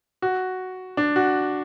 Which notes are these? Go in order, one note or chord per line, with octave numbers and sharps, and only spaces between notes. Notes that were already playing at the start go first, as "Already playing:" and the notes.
F#4
D4
F#4